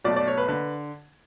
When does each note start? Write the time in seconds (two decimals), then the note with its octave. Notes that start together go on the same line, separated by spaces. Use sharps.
0.04 B1 B2 A3 D5
0.16 D5
0.27 C#5
0.38 B4
0.48 D3 B4